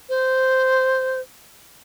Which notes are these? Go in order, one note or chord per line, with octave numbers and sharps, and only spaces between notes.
C5